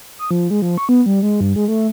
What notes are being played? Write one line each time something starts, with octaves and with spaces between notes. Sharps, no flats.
D#6
F3
G#3
F3
C#6
B3
G3
G#3
G2
G#3
A3